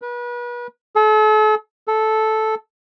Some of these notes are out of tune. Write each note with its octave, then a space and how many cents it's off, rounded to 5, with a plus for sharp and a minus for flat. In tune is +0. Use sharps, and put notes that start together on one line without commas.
B4 -35
A4 -40
A4 -10